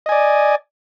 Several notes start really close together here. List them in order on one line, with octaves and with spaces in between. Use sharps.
D#5 G#5 D5